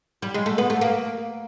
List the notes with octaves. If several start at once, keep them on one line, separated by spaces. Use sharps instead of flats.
G3
G#3
A3
B3
A3
A#3